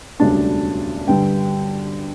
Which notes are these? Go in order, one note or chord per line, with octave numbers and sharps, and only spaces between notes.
E1 D2 C#3 G3 D4 A5
G2 D3 G3 G5